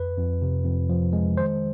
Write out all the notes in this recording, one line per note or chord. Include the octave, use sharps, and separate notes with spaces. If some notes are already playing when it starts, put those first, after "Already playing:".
Already playing: F2 B4
F2
C3
F2
F3
G#3
D#3 C5